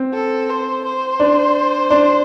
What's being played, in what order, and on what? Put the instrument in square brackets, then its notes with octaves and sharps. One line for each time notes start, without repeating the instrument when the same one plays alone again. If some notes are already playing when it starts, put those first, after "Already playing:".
Already playing: [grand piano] C4
[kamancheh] A4
C5
C5
[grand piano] D4
D4